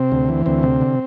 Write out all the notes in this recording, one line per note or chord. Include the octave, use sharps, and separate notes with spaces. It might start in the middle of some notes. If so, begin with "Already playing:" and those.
Already playing: C3 C4
D2
E3
D2 C4
C3
D3